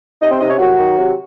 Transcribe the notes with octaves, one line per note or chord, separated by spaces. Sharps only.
C3 D#4 D#5
C4 C5
C3 D#4 D#5
C#4 C#5
C2 F#3 F#4
D#3
C3